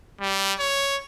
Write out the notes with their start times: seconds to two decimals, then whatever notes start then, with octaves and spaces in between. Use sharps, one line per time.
0.20 G3
0.59 C#5